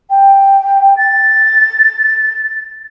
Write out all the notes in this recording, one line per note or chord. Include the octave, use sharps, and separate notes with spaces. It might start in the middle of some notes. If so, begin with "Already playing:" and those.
G5
A6